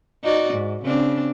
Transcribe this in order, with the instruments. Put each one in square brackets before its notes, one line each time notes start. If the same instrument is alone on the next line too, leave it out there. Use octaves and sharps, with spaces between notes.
[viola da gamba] D#4 F#4 D5
G#2
C#3 C4 D4